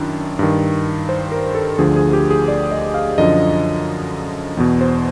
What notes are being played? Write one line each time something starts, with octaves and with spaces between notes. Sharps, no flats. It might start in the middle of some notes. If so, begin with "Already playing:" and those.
Already playing: F#2 D#3 D4 E4
G2 D#3
C5
A#4
A4
D2 D3 F3 G#4
G#4
G4
G#4
D5
D#5
F5
F#2 D3 F3 D#5
E2 B2
C5